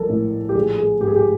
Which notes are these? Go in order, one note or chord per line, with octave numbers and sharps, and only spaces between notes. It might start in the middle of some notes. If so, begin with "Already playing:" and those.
Already playing: A#1 A4 A#4
A2
G4
A#1 G#4
G#4
G#2 G4
G#4
G4